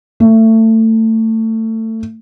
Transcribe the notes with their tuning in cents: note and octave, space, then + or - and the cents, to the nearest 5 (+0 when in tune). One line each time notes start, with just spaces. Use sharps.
A3 +25